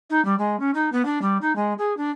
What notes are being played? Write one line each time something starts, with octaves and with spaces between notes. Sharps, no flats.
D#4
G3
G#3
C#4
D#4
B3
D4
G3
D#4
G#3
G#4
D4